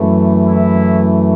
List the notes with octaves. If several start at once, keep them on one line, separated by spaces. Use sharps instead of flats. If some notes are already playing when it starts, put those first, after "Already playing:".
Already playing: F#2 E3 A3
E4